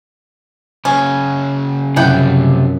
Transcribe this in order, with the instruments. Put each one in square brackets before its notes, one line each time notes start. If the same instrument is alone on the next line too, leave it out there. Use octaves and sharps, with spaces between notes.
[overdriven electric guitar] C#3 F#3 [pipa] C#4
[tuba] F#2 [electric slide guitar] C3 F3 [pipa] E4 F#5 G5